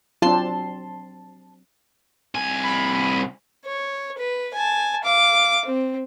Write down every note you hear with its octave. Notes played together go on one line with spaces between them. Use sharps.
F#3 C4 D4 F4 A5 C6
C2 G#5
B5
C#5
B4
G#5 A5
F5 D6
C4